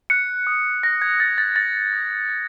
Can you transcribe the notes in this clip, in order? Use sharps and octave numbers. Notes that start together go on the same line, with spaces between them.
F#6 C#7
D#6
F#6 A#6
G#6
D#6 A6
A6
F#6 A6
D#6
F#6